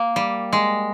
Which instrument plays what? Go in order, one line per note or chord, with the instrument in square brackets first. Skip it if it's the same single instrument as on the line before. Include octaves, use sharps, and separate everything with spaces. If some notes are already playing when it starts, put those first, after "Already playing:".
Already playing: [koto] A#3
G3
G#3